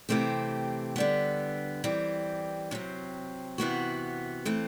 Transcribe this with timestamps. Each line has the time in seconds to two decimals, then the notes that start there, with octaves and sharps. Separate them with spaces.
0.09 C3 E3 A3 C4 G4
0.96 D3 G3 B3
1.84 E3 G3 C4 G4
2.71 C3 F#3 C4
3.58 C3 E3 B3 F#4
4.45 E3 A3 C4